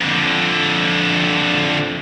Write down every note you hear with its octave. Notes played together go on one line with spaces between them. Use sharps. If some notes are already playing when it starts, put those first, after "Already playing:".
F2 D3